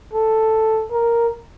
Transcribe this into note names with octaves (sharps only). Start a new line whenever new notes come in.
A4
A#4